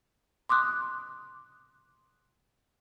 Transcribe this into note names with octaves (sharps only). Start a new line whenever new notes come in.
C6 D6 D#6 F#6